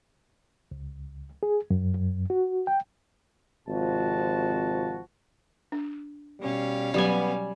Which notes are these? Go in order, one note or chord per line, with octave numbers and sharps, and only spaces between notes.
C#2
G#4
F#2
F#2
F#4
G5
G#1 C3 F3 F4 F#4 A5
D4
B2 G3 C#4 F5
F#3 G3 B3 G4 G#5